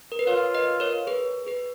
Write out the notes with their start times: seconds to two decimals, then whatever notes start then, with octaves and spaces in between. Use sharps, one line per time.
0.12 A#4
0.19 B4
0.27 F4 A#4 C#5
0.54 B4 D#5
0.80 A#4 C#5
1.07 G#4 B4
1.47 G#4 B4